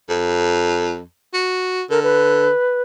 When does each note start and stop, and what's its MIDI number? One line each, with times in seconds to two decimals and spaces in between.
0.09 1.02 41
1.33 1.83 66
1.90 2.49 50
1.90 2.00 70
2.03 2.83 71